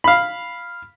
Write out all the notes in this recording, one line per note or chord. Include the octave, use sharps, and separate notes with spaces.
F5 B5